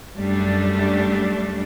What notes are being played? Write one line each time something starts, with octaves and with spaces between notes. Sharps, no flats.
F#2 G3 A3 D4